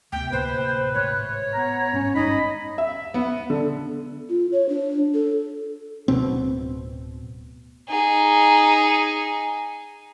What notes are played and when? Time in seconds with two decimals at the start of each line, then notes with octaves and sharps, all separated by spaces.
0.12 D2 C3 B3 G5
0.32 D2 A2 A#3 B4 C5
0.94 G#1 A2 C#5
1.54 B3 A#5
1.93 G1 G#2 C#4
2.15 G#1 G2 D#4 D#5 B5
2.78 E5
3.14 B3
3.50 D3
4.29 F4
4.52 C#5
4.69 D4
5.14 A4
6.08 D1 G1 B2 C4
7.89 D#4 G#4